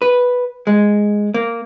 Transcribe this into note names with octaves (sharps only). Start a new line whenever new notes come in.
B4
G#3
A#3